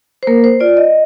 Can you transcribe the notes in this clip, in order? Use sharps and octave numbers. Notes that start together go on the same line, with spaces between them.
C5
A#3 A#4
C5
F4 D5
D#5